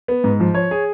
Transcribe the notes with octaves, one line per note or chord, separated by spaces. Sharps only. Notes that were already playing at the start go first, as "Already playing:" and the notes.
B3
G#2
F3
C#5
G#4